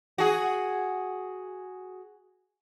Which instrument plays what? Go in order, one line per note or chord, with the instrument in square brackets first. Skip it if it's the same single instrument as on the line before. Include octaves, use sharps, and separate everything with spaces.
[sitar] F#4 G#4